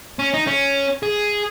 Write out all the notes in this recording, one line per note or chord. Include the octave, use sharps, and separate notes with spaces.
C#4
D#4
C#4
G#4